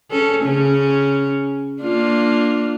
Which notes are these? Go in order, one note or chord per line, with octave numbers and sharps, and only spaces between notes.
C#4 A4
C#3 C#4
A#3 D4 F4